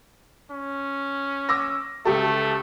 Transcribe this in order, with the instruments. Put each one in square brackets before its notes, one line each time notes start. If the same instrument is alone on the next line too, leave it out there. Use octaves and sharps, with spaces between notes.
[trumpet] C#4
[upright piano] D6 E6 A#6
[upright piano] C#2 G4 A4 [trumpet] A3